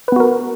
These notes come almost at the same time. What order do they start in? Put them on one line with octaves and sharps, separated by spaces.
B4 B3 F#4 A#4